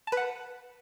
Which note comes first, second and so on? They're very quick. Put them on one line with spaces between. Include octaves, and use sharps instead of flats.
A5 B4 F#5